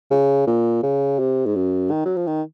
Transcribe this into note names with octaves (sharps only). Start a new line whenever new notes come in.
C#3
A#2
C#3
C3
G#2
F#2
D#3
F#3
F3
D#3